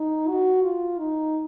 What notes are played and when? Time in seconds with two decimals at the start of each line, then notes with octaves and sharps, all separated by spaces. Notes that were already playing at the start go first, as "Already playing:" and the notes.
Already playing: D#4
0.28 F#4
0.63 F4
0.99 D#4